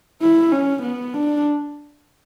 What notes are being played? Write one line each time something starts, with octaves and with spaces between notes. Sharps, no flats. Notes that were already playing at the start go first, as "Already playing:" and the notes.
E4
C#4
B3
D4